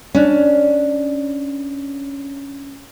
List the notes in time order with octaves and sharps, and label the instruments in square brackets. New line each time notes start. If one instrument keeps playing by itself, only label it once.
[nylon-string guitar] C#4 D4